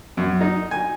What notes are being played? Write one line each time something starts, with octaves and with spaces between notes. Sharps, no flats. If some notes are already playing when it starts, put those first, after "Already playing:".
F#2
D#4
G#5